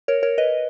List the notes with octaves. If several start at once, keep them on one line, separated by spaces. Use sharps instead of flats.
A#4 C#5
A#4 C#5
B4 D#5